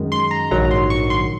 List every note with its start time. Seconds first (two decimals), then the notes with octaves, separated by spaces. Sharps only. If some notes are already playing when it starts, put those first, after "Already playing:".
Already playing: F#2 D#3 G#3
0.12 C6
0.31 A#5
0.51 A#1 G#2 D#3 F#3 A#5
0.71 C6
0.90 C#6
1.10 C6